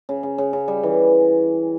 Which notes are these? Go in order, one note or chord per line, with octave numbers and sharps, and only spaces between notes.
C#3
C#3
C#3
C#3
G3
E3